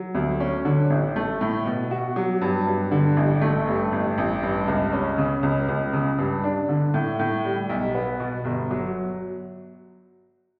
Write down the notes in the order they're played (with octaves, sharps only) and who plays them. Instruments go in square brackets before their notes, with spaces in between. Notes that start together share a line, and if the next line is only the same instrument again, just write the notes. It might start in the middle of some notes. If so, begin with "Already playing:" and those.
Already playing: [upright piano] F#3
D2
C#4
D3
A1
A3
A2
B2
F#4
F#3
G2
G2
D3
A1
A3
G2
A1
A1
G2
C#2
C#4
C#3
C#2
C#2
C#3
G2
D4
D3
A2
A2
G3
B1
B3
B2
G1
F#3